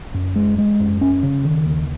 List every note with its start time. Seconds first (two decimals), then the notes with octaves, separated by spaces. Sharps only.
0.14 F#2
0.36 G#3
0.58 G#3
0.80 F#2
1.01 C#4
1.23 C#3
1.45 D#3
1.66 D#2